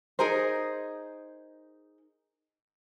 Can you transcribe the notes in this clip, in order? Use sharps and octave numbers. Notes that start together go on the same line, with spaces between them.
D#4 G#4 A#4 C5